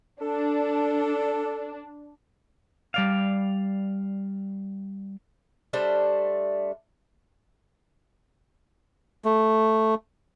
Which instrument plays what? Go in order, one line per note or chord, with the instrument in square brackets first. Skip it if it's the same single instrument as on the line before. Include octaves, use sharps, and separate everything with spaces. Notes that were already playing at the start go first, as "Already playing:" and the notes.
[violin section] D4 [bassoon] A4
[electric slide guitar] G3 D5 F5
[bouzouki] G3 A3 D4 C5
[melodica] A3